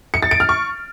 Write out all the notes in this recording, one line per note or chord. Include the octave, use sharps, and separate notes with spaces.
C#7
A6
D7
F6
C#6